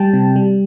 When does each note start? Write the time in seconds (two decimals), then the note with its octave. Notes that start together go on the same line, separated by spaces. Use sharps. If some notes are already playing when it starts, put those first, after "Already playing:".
Already playing: G3 G5 A5
0.14 C3
0.36 G3